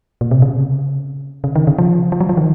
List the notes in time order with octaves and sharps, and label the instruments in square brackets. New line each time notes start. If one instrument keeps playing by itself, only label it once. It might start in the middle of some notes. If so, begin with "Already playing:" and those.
[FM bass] A#2
C3
C#3
C#3
D#3
C#3
F3
F3
F#3
F3
D#3